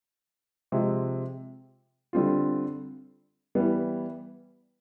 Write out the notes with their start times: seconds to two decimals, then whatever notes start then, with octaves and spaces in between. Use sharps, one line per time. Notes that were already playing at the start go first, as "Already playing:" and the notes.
0.72 C3 F3 G#3 C4
2.13 D3 G3 C4 F4
3.55 E3 G3 B3